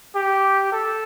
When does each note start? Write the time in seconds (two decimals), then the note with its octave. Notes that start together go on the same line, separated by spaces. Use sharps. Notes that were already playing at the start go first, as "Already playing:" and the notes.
0.15 G4
0.72 A4